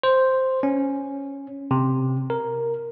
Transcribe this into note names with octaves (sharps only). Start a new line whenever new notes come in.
C5
C#4
C3
A#4